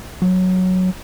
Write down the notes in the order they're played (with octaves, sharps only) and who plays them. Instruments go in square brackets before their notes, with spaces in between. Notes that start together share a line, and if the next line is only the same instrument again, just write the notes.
[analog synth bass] F#3